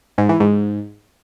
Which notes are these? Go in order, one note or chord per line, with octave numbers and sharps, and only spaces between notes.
G#2
E3
G#2